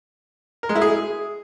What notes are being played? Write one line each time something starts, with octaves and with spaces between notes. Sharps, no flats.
A#4
G#3
E4
G#4